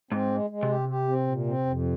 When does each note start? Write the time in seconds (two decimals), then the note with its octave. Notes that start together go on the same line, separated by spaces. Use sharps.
0.11 G#2 C4
0.31 G#3
0.50 G#3
0.63 C3
0.69 G4
0.89 G4
1.08 C4
1.27 A#2
1.47 C4
1.66 F2